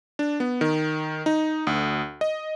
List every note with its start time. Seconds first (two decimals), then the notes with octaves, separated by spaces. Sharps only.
0.19 D4
0.40 B3
0.61 D#3
1.26 D#4
1.67 D2
2.21 D#5